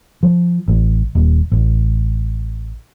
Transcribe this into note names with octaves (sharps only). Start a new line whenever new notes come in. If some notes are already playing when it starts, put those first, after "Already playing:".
F3
A1
D#1
A1